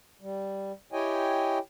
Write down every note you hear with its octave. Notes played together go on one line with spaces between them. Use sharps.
G3
E4 G4 C#5 D#5 G5 G#5